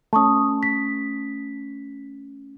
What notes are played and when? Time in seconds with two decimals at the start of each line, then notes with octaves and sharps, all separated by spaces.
0.13 A3 C#4 A5 C#6 D#6
0.63 B6